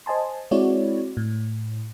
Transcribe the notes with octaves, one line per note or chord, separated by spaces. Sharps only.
C5 D#5 G#5 A5 C6
G#3 C4 E4 F#4 C#5 D5
A2